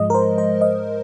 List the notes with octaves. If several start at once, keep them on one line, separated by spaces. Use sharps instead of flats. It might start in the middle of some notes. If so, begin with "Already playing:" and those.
Already playing: G#2 F3 G#3 D#5
A#4
C5
C5
D#5